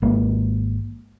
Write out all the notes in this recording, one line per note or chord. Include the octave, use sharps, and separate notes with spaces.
G#1 G#3 A#3